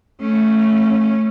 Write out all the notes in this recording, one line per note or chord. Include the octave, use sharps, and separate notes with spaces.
A3 C#4